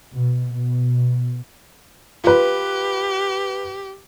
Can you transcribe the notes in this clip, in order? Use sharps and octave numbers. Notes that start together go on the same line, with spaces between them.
B2
B2
F4 G4 B4